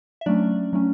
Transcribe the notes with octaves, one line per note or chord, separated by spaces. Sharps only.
E5
F#3 A3 C#4 D4 D5
F#3 A3 C#4